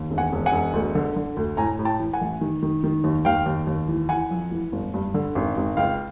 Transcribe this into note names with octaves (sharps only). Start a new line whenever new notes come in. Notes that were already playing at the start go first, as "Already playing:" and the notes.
Already playing: D#2
E1
F#5 G#5
E1
F#5 G#5
E1
D2
D3
D3
D2
A2 G#5 A#5
A2
G5 A5
E3
F#5 G#5
A1
D#3
D#3
D#3
D#2
D#2 F5 G5
D#2
D#2
E3
E3 F#5 G#5
F2
E3
G1
G2
D3
G#1
G#1
C#2 F5 G5